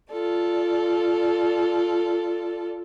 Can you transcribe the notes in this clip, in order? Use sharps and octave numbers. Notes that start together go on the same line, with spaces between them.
F4 A4 D5